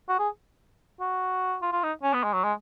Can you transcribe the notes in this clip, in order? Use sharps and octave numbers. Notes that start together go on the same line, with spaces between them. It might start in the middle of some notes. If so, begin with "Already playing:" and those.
F#4
G#4
F#4
F4
F4
D#4
C#4
B3
G#3
F#3
G#3